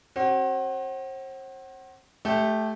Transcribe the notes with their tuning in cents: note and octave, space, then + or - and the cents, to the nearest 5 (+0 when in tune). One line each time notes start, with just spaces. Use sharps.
C4 +40 F#4 +30
A3 -15 G4 +0